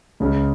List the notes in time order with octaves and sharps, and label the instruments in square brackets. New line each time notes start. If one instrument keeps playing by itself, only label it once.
[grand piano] C#2 C#3 G#3